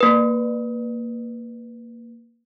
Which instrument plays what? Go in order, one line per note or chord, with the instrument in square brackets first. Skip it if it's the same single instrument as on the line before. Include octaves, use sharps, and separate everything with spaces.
[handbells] A#3 B4